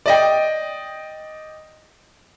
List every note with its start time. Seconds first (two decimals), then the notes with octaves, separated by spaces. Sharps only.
0.06 D5 D#5 G5